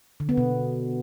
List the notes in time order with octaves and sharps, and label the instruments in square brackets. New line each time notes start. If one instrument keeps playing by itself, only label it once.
[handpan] D3
B3
B2